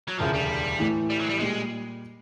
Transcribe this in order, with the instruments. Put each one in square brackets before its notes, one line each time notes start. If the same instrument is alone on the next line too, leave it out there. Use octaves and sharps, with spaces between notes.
[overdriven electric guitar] F#3
[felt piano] E1 D2 C#3 [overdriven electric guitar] F3
[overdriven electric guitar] G3
[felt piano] A2 E3 A3
[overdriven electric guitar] G3
F#3
G#3
G3
[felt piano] A#2 G3 [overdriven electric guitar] G#3